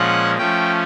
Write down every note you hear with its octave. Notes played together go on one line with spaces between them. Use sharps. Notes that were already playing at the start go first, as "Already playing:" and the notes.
Already playing: A#2 F3 G#3 C#4 F#5
F3 A3 C#4 G5